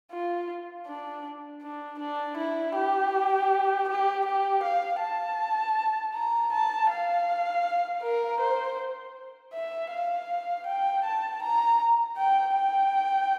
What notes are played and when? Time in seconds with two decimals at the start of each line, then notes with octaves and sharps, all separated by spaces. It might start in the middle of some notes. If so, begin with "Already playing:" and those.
0.11 F4
0.87 D4
1.62 D4
2.00 D4
2.37 E4
2.75 G4
3.89 G4
4.26 G4
4.64 F5
5.01 A5
6.14 A#5
6.53 A5
6.90 F5
8.03 A#4
8.40 C5
9.54 E5
9.92 F5
10.67 G5
11.05 A5
11.42 A#5
12.18 G5
12.55 G5